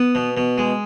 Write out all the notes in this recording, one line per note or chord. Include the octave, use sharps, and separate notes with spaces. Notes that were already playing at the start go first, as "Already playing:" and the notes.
Already playing: B3
B2
B2
G#3